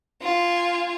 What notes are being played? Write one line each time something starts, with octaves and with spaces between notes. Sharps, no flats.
F4 G#5